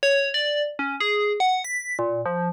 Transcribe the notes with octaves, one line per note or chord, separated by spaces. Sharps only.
C#5
D5
C#4
G#4
F#5
B6
A#2
F3